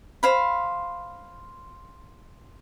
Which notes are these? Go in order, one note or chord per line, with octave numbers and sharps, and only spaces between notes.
C5 F5 B5